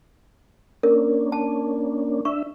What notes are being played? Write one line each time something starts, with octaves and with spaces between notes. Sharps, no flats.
A#3 C#4 D4 A#4
A5
D4 E5 C#6